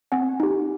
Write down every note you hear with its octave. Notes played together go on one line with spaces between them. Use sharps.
C4 F#5 G#5
D#4 G4